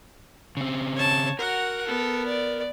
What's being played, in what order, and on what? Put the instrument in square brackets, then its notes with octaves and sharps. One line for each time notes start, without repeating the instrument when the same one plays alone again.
[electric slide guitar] C#3 C4
[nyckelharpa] C#5 A5
[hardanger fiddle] F#4 [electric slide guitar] A#4 [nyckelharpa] F#5
[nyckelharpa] B3 [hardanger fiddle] A4
[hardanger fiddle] D5